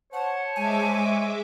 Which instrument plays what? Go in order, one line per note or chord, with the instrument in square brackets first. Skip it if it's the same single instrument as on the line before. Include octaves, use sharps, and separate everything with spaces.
[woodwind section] C5 C#5 [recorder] F#5 [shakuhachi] A5
[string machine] G#3 E5 D6 [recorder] G#5